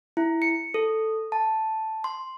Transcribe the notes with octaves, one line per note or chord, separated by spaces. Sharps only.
E4
C#7
A4
A5
C6